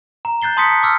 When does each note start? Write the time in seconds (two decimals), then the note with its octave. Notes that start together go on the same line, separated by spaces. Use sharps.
0.25 A#5
0.42 F#6 G6 A6 C7 G7
0.57 A5 C6 D#6 G6 B6 C#7
0.69 C#7
0.83 D6 E6 F6